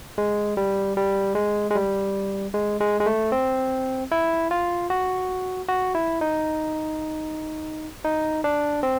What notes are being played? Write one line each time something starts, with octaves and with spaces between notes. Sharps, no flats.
G#3
G3
G3
G#3
G#3
G3
G#3
G#3
G#3
A3
C4
E4
F4
F#4
F#4
E4
D#4
D#4
D4
C4